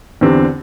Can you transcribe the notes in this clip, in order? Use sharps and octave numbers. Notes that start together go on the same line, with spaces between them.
E2 D3 C4 G4